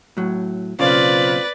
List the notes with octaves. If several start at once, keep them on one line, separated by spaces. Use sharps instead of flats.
A2 F#3
B1 C#3 A#3 C4 F4 B4 D5